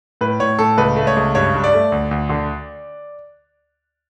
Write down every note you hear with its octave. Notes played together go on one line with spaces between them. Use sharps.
A2 B4
A2 C#5
A2 A4
C#2 B4
A3
C#5
C#2
G2 C#5
G2
D5
A3
D2
D2
D3